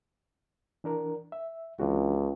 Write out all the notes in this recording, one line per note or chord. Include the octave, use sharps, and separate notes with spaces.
E3 D4 A#4
E5
C#2 E3 D4 F#4